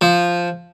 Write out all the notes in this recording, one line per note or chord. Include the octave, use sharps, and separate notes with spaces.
F3